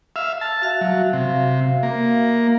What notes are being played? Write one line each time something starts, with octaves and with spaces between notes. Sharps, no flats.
E5 F5
A5
F#4 E5 F5
F#3
C3
A#3